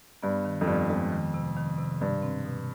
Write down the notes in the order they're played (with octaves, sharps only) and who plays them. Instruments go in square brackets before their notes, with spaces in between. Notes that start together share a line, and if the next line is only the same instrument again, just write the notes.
[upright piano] G2 [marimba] B3
[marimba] D#3
[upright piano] F2
[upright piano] G2 [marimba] B3
[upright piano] F2 [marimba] G#3
[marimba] D#3
C3
D#3
C3
[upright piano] G2 [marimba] B2
[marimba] C4
B2